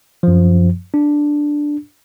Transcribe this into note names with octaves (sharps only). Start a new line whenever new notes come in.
F#2 F3
D4